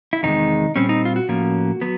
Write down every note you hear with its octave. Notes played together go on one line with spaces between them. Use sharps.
E4
E2 C3 D#3 G#3 D#4
A#2 G3 C4 C#4
D#4
F4
F#4
A2 F3 A#3 C#4
F#3 B3